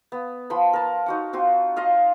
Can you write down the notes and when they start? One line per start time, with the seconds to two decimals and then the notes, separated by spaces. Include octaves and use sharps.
0.12 B3
0.50 F3 B3 B5 C6
0.73 A#4 A5
1.06 D#4 F#4 F#5
1.33 C4 F4 F#4 C6
1.76 F4 D#5 F5